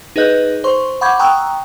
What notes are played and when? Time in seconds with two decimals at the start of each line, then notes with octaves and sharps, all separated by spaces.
0.16 D#4 G#4 B4 D#5 F#6 G6
0.64 C5 C6 C#6
1.01 F#5 B5 C#6 D6 G6 G#6
1.19 G5 A#5 C#6 D#6 E6 F#6